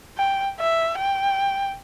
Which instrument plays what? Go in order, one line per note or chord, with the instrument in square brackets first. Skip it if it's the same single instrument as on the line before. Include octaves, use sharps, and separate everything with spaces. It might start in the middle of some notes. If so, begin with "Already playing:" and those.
[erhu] G5
E5
G5